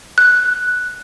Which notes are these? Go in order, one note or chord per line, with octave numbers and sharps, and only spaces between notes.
F#6